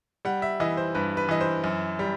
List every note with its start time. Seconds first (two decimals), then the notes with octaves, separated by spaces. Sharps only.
0.25 G3 F#5
0.42 E5
0.60 E3 D#5
0.77 C5
0.95 G2 B4
1.17 B4
1.29 E3 D#5
1.41 C5
1.64 F#2
1.99 G3